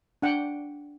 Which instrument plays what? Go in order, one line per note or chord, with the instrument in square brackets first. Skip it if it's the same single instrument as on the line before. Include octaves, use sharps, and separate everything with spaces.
[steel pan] D4 F#5 G5